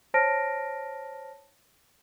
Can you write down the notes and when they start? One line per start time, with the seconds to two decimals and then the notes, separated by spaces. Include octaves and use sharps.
0.14 C5 C#5 A5 F6 A#6 D7